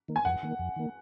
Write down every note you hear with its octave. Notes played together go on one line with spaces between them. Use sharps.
D#3 A#3
G#5
F2 F#5
D#3 A#3
F2
D#3 A#3